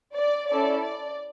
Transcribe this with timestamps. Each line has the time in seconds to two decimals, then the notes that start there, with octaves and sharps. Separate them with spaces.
0.15 D5
0.49 C#4 E4 A4 D5
0.82 D5